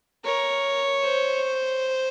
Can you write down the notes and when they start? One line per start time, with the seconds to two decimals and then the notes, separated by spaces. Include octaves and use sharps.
0.24 A#4 C#5
1.03 C5